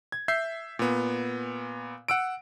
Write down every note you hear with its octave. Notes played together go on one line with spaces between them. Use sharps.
G#6
E5 G6 C7
A#2 B3
F#5 E6 D7